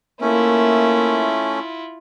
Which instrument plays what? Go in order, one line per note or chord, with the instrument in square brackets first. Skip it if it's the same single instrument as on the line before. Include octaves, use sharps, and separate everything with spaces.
[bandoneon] A3 C#4 [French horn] A#3 [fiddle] E4 F4